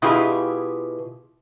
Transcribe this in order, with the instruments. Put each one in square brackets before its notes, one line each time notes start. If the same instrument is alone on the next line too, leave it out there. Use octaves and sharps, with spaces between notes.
[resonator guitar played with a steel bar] B2 E4 F4 G4 G#4